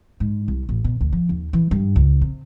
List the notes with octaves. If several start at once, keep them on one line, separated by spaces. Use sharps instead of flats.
G#2
C2
A1
B2
D2
F3
D#2
E3
G2
C#2
C3